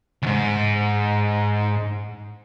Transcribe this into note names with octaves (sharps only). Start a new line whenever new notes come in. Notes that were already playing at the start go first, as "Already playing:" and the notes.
D2 G#2